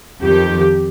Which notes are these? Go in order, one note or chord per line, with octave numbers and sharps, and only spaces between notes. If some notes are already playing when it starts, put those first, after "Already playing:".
F2 D#3 G4